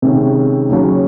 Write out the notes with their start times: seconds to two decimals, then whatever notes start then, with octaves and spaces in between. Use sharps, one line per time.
0.02 C3 D#3 G#3 C#4
0.69 D#2 C#3 F#3 C#4